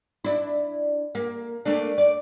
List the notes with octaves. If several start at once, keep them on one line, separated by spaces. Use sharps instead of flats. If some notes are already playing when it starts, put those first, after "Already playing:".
D4 E4
A#3
A3 A#3 D4
D5